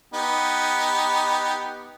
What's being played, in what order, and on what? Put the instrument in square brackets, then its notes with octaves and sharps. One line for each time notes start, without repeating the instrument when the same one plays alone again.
[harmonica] B3 D#4 G4